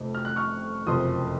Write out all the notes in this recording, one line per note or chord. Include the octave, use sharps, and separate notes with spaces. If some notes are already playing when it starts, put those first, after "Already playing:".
Already playing: F1 F2 C3
F6
F#6
C#6 F6
F#1 F2 C3 F3 C6 D#6